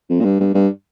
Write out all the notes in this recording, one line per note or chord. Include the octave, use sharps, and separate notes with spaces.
F2
A#2
G2
G2
G2